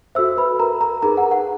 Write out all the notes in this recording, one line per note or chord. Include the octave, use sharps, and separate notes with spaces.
F#4 A4 C5 E5 E6
B4 B5
A#4 A#5
A#4 A#5
D#4 G#4 A#4 B4 A#5
F#5
F#5